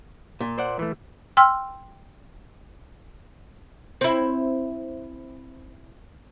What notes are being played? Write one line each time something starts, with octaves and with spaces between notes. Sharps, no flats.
A#2
C5 D5 F#5
E3 A3
G5 C6 E6 F6
C4 E4